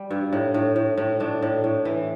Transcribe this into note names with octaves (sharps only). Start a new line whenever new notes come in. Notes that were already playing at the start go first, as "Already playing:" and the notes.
Already playing: G3
G2
A2
A2
A2
A2
A2 D4
A2
A2
E3